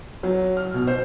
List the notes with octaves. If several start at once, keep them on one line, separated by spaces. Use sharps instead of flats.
F#3
F6
B2
C5